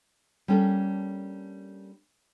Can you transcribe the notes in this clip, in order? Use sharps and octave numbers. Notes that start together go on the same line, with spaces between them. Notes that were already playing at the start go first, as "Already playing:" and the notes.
G3 A#3 C#4 D4 A4